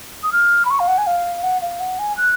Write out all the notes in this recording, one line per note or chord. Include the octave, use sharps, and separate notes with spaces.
D#6
F6
B5
C#6
F5
F#5
G#5
F5
F#5
F5
F#5
G#5
F#6